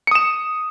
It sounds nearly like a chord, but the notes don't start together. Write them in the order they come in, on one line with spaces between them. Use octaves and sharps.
C#7 D#6 E7